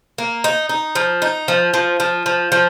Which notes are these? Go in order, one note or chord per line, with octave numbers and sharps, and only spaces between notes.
A#3
D#4
D#4
F3
D#4
F3
F3
F3
F3
F3